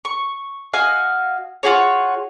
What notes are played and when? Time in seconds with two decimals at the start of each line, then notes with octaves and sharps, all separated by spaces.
0.05 C#6
0.74 F#4 D#5 F5 G#5
1.63 F4 F#4 G#4 C#5